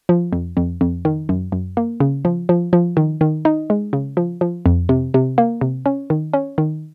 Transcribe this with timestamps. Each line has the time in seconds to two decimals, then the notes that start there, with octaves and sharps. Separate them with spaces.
0.09 F3
0.33 F2
0.57 F2
0.81 F2
1.05 D#3
1.29 F#2
1.52 F#2
1.77 A#3
2.00 C#3
2.25 F3
2.49 F3
2.73 F3
2.97 D#3
3.21 D#3
3.45 D#4
3.70 G#3
3.93 C#3
4.17 F3
4.41 F3
4.66 F2
4.89 C3
5.14 C3
5.38 A#3
5.61 C3
5.86 C#4
6.10 D#3
6.34 C#4
6.58 D#3